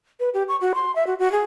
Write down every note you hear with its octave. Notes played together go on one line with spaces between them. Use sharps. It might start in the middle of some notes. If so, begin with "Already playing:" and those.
B4
G4
C#6
F#4
C6
E5
F#4
F#4
G#4